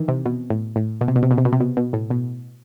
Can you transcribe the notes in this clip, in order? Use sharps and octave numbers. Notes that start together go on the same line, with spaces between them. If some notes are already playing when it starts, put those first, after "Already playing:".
Already playing: D#3 E3
C3
B2
A2
A2
B2
C3
B2
C3
B2
C3
B2
C3
B2
B2
A2
B2